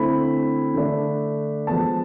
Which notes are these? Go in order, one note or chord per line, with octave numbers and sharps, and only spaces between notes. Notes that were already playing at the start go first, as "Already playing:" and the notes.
Already playing: D3 A3 C4 E4 B5
D3 A3 D4
F3 G#3 B3 A5